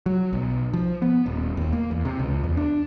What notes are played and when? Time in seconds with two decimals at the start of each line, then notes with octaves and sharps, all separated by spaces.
0.06 F#3
0.33 B1
0.74 F3
1.02 B3
1.26 D#1
1.57 D#2
1.73 A#3
1.91 E2
2.05 C3
2.19 C#2
2.44 E2
2.57 D4